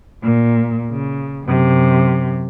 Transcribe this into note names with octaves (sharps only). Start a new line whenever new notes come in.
A#2
C#3
F#2 C3